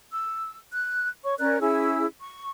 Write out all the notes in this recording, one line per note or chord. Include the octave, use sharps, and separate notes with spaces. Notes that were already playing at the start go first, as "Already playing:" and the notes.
E6
F#6
C#5 C#6
C#4 A#4 D5 F#6
C#4 E4 G#4 E6
C#6